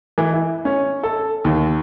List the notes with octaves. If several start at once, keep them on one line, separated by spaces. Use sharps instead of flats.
E3
E4
C#4
A4
D#2